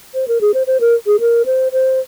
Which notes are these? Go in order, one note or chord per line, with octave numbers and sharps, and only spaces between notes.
C5
A#4
G#4
C5
C5
A#4
G#4
A#4
C5
C5